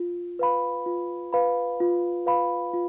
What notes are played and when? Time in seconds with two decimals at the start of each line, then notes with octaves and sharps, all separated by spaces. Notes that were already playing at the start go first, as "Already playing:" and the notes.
Already playing: F4
0.39 B4 F5 B5
0.86 F4
1.33 B4 F5 B5
1.80 F4
2.26 B4 F5 B5
2.73 F4